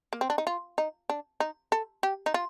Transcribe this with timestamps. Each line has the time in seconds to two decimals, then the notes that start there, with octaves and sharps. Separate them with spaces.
0.13 A#3
0.21 C4
0.30 D4
0.38 D#4
0.47 F4
0.78 D#4
1.09 D4
1.40 D#4
1.72 A4
2.03 G4
2.26 D#4
2.34 F4